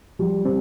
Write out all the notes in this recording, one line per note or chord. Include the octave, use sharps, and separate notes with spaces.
F3 G3
C3 C4